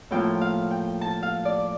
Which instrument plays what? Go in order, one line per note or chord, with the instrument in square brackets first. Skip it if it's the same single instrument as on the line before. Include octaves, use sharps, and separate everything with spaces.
[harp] A2 F3 A#3 F4 G5
F5
G5
A5
F5
D5